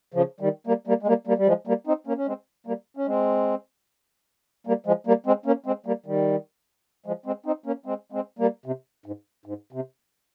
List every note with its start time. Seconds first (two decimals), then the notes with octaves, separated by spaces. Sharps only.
0.14 C#3 F3
0.40 D#3 G3
0.67 G3 A#3
0.87 G3 A#3
1.03 G#3
1.07 G3 A#3
1.27 G3 A#3
1.38 G3
1.47 F3 G#3
1.67 G3 A#3
1.87 C4 D#4
2.07 A#3 C#4
2.17 C#4
2.27 G#3 C4
2.67 G3 A#3
2.97 C#4
3.06 G#3 C4
4.67 G3 A#3
4.86 F3 G#3
5.07 G3 A#3
5.26 G#3 C4
5.46 A#3 C#4
5.66 G#3 C4
5.86 G3 A#3
6.06 D#3 G3
7.06 F3 G#3
7.26 G#3 C4
7.46 C4 D#4
7.66 A#3 C#4
7.86 G#3 C4
8.12 G#3 C4
8.39 G3 A#3
8.66 C3
9.06 G#2
9.46 G#2
9.72 C3